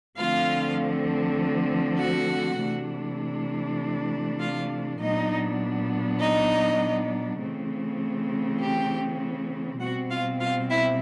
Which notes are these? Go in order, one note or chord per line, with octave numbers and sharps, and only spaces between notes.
D3 F3 A3 C4 F4 F5
F#4 F#5
C3 E3 A3 D4
F4 F5
A#2 F#3 B3 D4 D#4 D#5
D#4 D#5
C#3 E3 A3 C4
G4 G5
B2 G3 C4 F#4 F#5
F4 F5
F4 F5
E4 E5